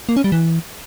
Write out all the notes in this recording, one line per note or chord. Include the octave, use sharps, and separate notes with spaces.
A#3
C#4
G3
E3